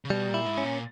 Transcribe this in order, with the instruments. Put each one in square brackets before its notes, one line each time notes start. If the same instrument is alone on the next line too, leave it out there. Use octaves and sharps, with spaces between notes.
[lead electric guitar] C#3
[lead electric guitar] B2 [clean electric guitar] G3
[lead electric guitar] A#2
[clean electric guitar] E4
[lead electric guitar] G#2
[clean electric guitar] C#4
[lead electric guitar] A#2